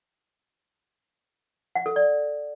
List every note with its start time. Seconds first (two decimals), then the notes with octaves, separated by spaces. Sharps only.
1.75 F#5
1.86 A4
1.96 D5